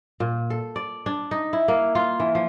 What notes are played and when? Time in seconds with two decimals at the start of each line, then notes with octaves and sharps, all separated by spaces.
0.20 A#2
0.50 A4
0.76 D5
1.06 D4
1.31 D#4
1.53 E4
1.68 A#3
1.95 F4
2.20 E3
2.35 F3